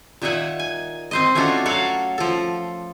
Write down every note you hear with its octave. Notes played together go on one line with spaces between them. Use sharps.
A#2 D#3 D#4 E5 F#5 G#5
G#5
C4 C5 D#5
A3 C#4 D4 F4 F#4 A4
F#3 F#4 A4 C#5 F5
F3 A4